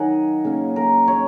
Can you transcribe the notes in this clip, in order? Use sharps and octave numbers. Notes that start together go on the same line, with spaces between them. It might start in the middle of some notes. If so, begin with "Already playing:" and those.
Already playing: D#3 F#3 A#3 D#4 D#5 F#5 G#5
C#3 A#3 C#4
A#4
C#5